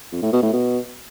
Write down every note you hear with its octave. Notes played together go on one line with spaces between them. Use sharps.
F2
A2
B2
A2
B2